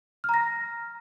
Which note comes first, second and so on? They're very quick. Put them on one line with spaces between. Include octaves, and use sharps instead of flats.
F6 A#5 A#6